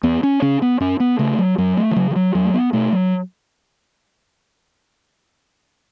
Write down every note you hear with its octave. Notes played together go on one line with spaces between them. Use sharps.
E2 B3
C#4
C#3 C#4
B3
F#2 C#4
B3
C#3 A3
F#3
F#2 F#3
A3
E3
C#3 F#3
E3
F#3
E2 F#3
A3
B3
B2 A3
F#3